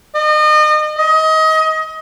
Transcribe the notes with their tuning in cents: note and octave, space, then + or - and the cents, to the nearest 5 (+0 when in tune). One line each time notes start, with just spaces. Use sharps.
D#5 -35
D#5 +25